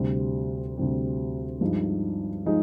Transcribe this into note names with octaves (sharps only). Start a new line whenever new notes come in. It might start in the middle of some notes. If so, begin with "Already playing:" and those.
Already playing: D2 C3 G3 C4 G4
D2 C3 G3 C4 G4
G2 F3 G#3 D#4
F3 G#3 D#4